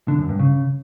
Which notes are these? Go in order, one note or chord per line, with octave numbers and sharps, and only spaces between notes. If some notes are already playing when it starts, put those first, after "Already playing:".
D3
F#2
G2
C#3